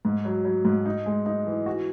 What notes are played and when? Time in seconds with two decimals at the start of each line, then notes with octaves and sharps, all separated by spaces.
0.05 G#2
0.25 F#3
0.45 F#3
0.65 G#2
0.86 D#4
1.06 G#3
1.26 D#4
1.47 E3
1.66 F#4